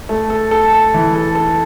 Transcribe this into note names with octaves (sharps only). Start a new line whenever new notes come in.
A3
A4
A4
A4
E3
A4
A4